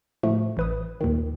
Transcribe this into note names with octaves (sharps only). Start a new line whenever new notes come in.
A2 F3 A3
A1 B4 D#6
D#2 A#2 D#3